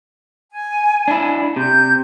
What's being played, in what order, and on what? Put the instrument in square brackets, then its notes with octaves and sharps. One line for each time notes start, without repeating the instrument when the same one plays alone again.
[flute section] G#5
[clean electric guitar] D4 E4
[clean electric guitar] C3 [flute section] G6